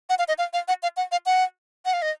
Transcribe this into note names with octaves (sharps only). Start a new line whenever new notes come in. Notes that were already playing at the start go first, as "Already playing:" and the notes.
F#5
F5
D#5
F5
F5
F#5
F5
F#5
F5
F#5
F#5
F5
D#5